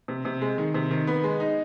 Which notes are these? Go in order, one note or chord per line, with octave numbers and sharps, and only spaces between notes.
C3
C3
G#3
D#3
C3
D#3
B3
G#3
D#4